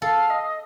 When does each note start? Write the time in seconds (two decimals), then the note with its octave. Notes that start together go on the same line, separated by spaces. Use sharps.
0.02 A4 F5
0.30 D#5